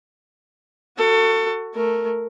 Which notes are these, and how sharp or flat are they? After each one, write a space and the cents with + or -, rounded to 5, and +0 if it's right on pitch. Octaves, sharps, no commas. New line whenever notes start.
F#4 +0 A4 +30
A3 +0 A#4 +0